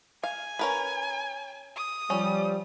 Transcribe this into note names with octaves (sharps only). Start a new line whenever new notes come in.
F5 G#5
C#4 A#4 B4
D#6
F3 G3 C#4